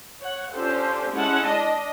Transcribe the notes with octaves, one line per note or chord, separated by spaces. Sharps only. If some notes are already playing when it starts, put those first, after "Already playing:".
C#5 F#5
C#4 D4 F4 G4 A4 C5
G#3 C#4 E4 F#5 A5
D4 D#5